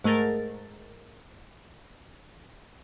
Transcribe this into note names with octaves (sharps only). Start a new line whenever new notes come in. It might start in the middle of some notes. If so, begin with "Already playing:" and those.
G#2 A3 G#4 A#4 A6